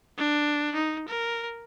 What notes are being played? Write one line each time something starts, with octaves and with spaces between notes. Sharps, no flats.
D4
D#4
A#4